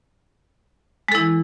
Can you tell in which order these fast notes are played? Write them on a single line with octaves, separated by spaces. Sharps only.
G#3 A4 E4 E3